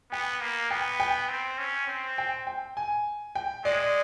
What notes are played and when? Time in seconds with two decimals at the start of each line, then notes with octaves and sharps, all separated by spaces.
0.12 B3 G5
0.41 A#3
0.70 B3 G5
1.00 G5
1.29 C4
1.58 C#4
1.88 C4
2.18 G5
2.47 G5
2.77 G#5
3.35 G5
3.65 G#3 D5